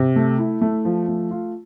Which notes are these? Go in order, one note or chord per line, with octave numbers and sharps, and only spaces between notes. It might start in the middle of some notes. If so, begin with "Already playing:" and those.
Already playing: C3
A3
E4
A3
F3
A3
F4